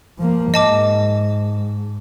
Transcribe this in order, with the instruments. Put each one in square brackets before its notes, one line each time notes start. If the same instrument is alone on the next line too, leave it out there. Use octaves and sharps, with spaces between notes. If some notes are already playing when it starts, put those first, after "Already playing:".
[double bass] F3 A#3
[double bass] G#2 [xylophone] D#5 A5 D6